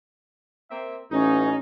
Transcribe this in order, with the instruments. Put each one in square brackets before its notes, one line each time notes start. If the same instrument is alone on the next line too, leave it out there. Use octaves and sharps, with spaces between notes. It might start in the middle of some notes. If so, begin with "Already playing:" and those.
[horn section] A#3 C4 E5
[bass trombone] A1 [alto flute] C#4 [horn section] D#4